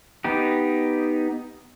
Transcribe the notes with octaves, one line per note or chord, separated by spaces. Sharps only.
B3 D#4 G4